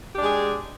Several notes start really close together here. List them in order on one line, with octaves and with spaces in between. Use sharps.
G4 D4 G#3 G#4